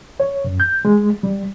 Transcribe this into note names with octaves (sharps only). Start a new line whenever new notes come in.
C#5
F#2
G6
G#3
G3